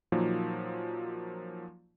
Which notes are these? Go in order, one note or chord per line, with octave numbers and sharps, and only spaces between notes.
A#2 F3 F#3 A#3 D#4